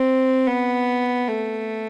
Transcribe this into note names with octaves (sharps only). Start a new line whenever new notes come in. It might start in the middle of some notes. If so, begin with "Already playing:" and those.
Already playing: C4
B3
A3